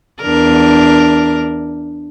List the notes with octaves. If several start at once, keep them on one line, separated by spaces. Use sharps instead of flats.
E2 D4 A#4